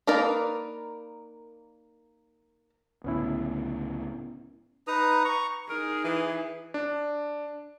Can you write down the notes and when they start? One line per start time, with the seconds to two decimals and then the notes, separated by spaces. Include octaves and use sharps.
0.07 A#3 D#4 A#4 B4 D5
3.04 C#2 A2 D3 B3 C#4 E4
4.87 D#4 B4 A#5 D#6
5.24 A#5 C#6
5.70 D#4 G#4 A#4
6.04 E3
6.74 D4